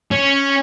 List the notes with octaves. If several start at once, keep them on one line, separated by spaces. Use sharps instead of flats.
C#4